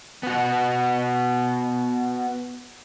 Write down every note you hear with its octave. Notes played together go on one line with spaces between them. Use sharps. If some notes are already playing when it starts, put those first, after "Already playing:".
B3 F#4